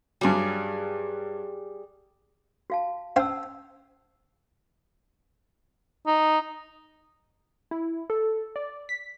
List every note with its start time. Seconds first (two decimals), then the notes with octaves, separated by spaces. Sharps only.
0.21 G2 F#3 G3 G#4
2.70 F#4 F5 A5
3.16 C#4 C5 F5 G5 A5 E6
6.07 D#4
7.71 E4
8.10 A4
8.56 D5
8.89 B6